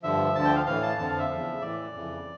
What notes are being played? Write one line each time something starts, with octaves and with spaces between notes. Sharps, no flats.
G2 D3 F3 E5
D2 D3 F3 A5
G5
F5
A2 E3 F5
A5
F2 D3 F3 A5
F5
E5
E2 C#3 F3
A2 E3 D5
F2 C#3 E3